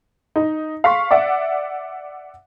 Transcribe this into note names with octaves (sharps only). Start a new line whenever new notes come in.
D#4
F5 C6 C#6 B6
D5 E5 F#5